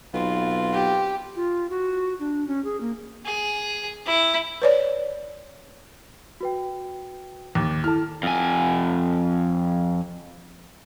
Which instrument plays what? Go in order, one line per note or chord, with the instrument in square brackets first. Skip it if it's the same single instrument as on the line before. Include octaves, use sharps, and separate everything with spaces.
[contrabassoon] B1 [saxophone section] B3 C4 F4
[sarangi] G4
[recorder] F4
F#4
D4
C#4
G#4
A#3
[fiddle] G#4
E4
[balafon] B4 C#5 D5
[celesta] F#4 B4 G5
[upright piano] D#2 [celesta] D6 A6
[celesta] E4 A4 [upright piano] A5 F6
[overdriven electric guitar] F2 G#5